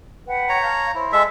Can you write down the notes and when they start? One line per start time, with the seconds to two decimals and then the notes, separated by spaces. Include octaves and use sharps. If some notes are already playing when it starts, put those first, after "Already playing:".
0.26 B4 F#5 G5
0.49 C#5 A#5
0.61 F5 A5 G6
0.95 E4 C5
1.12 G#3 A4 E5